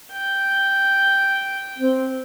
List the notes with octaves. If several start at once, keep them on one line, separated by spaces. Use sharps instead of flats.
G5
C4